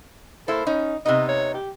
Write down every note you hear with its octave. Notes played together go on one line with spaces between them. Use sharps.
A#3 E4 A4 C5
C#4 D#4
C3 B3 D#4 D#5
C#5
G4